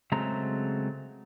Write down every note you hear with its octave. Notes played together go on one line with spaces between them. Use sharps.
C#3 F#3 G#3 A3 C4 A#5